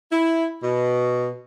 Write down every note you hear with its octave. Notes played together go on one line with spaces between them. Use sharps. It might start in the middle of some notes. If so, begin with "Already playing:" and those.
E4
B2